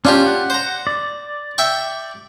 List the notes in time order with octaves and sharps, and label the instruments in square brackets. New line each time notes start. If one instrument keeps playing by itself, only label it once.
[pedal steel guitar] C#4 [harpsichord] D4 F4 G4
[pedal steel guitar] F#5
[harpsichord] C5 A#5
[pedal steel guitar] D5
[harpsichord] E5 G5 C#6